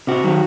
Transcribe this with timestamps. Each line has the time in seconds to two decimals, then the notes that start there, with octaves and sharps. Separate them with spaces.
0.07 C3 F#4
0.24 D#3 F#3